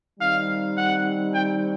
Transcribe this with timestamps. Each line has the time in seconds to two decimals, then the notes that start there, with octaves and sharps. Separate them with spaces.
0.20 D#3 G3 C4 D#4 F5
0.78 F#5
1.34 G5